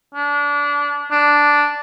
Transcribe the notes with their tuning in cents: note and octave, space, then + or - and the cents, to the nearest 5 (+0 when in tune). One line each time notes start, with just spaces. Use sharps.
D4 -25
D4 -5